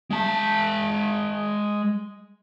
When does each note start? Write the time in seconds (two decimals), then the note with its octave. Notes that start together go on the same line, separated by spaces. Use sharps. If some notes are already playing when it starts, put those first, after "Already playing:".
0.11 G#3 A5